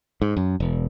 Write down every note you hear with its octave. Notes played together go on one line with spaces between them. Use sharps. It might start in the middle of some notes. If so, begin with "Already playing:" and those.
G#2
F#2
E1